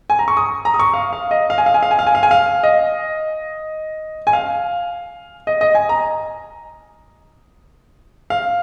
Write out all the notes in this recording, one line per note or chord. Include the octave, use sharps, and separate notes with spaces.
G#5
A#5
C#6
D#6
A#5
D#6
C#6
F5
F5
D#5
F5
G#5
F5
G#5
F5
G#5
F5
G#5
F5
G#5
F5
D#5
G#5
F5
D#5
D#5
G#5
A#5
F5